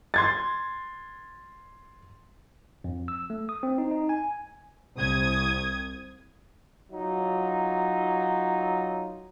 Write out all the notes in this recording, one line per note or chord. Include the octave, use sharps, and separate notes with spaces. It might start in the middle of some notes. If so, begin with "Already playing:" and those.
C6 G#6 A6
F2
E6
A3
D#6
C4
D#4
D#4
G#5
C2 D#6 G#6
F#3 D#4 F4